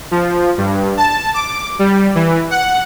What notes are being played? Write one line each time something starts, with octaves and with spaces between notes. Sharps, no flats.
F3
G2
A5
D6
G3
E3
F#5